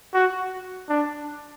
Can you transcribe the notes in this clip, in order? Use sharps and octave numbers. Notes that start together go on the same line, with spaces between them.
F#4
D4